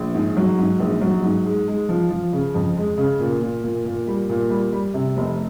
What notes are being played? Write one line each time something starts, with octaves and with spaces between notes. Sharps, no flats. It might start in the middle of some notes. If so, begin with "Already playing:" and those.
Already playing: A#1
G#2
F#3
G#2
A#1
F#3
G#2
G#3
G#3
F3
F3
C#3
F2
G#3
C#3
A#2
A#2
A#2
A#2
G3
A#2
G3
G3
C3
F1